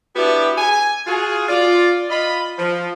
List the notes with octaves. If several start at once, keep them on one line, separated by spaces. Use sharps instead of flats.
B3 D4 E4 F#4 G4
G#5
F4 F#4 G#4
F4 D5
F4 D#5 B5
F3